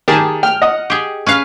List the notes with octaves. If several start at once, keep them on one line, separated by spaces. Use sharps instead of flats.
D#3 G4 G#4 A5
G5 F6
D#5 F#5 D#6
G4 G#4
C#4 B4 F5